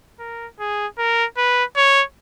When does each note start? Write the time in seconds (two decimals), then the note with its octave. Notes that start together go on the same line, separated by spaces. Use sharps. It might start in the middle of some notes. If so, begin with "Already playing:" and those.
0.19 A#4
0.59 G#4
0.98 A#4
1.37 B4
1.76 C#5